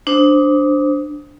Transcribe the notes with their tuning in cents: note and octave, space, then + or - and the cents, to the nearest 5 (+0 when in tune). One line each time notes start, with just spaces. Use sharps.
D4 +0 C5 +0 D#6 +20